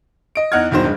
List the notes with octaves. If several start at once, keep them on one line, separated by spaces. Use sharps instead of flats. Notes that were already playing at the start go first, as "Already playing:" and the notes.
D#5 D7
E2 D#4 F#5 F6 G#6
E1 E2 G2 D#3 F#3 C5
G2 G#3